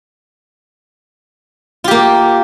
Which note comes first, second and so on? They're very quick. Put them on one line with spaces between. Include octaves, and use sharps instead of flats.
F4 G4 A#3